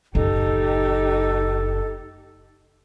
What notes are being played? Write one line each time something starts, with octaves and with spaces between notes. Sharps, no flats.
F#1 A2 D#4 G4 A4